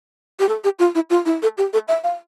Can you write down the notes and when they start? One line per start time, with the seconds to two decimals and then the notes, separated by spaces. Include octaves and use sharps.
0.39 G4
0.48 A4
0.64 G4
0.79 F4
0.95 E4
1.10 F4
1.25 E4
1.42 A4
1.58 G4
1.73 A4
1.88 E5
2.04 F5